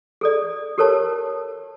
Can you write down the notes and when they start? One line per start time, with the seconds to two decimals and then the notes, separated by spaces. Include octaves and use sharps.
0.21 G#4 A4 D5
0.78 G4 A4 A#4 C#5 A5